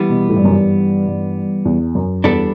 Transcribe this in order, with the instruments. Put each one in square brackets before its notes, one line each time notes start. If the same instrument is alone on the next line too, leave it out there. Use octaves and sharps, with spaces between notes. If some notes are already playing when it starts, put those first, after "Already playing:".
Already playing: [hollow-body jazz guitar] E3 G3 B3
[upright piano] B2
A2
G2
F#2
G2
G2
E2
F#2
[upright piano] E2 [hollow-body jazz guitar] G3 B3 D4 A4